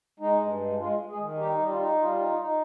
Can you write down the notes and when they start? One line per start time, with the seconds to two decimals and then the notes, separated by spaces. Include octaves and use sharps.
0.20 G#3 D#4
0.40 G2
0.60 G#3
0.79 G#3 F4
0.99 G#3
1.09 G#3 G#4
1.18 D#3
1.38 G3 D#4 G4
1.58 G3
1.69 F4
1.79 D#4
1.98 G3 F4
2.19 D#4
2.39 D#4